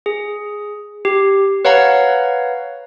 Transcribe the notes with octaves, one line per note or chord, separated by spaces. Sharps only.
G#4
G4
B4 C#5 F5 F#5 A#5